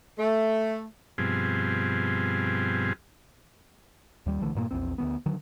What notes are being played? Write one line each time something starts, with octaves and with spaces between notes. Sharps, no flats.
A3
G2 B2 F3 C4 G#4
D#2 G3
B1 D3 E3 A3
G2 A#2 F3 A#3
A#1 E2 C4
D2 E3 B3
D3 D#3 F#3